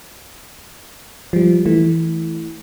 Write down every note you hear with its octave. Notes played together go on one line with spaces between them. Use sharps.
F3 G3
E3 A3